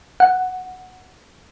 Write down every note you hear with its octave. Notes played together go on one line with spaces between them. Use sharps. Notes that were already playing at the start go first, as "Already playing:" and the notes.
F#5